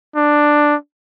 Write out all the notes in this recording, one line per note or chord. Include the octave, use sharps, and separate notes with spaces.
D4